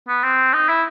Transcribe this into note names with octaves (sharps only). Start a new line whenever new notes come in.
B3
C4
D#4
E4